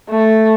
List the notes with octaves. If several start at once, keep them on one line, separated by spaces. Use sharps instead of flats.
A3